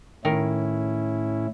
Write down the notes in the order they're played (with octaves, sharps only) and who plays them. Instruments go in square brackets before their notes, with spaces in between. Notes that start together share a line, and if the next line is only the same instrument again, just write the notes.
[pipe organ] A2 C#4 E4 [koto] D#3 A#4